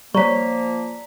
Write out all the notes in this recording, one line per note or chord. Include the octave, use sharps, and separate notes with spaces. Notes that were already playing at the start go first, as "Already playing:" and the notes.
F3 G3 A#3 C#5 D5 A#5 C#6 B6